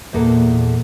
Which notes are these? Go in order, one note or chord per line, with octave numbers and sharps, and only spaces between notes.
E2 A#2 A#3 A4